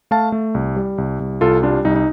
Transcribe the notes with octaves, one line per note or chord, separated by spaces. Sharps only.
A3 F5 A5
A3
C2
G3
C2
C2
C2 F4 A4
G3 D4 F4
C2 D#4
D#4